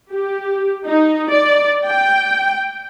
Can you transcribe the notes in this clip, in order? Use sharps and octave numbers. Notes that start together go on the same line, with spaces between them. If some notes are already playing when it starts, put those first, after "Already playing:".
G4
D#4
D5
G5